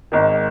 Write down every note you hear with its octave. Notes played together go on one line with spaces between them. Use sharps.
G#1 G#2 D#3